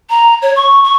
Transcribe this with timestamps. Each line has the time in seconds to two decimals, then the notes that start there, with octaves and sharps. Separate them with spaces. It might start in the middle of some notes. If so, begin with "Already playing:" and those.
0.10 A#5
0.42 C#5
0.56 C#6
0.84 C#6